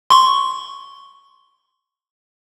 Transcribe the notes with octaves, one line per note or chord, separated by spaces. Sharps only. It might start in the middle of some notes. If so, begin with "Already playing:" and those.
C6 C#6